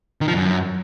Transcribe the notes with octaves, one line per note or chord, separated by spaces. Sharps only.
D#3
F3
F#2